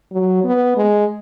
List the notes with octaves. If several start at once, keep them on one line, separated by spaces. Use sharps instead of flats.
F#3
B3
G#3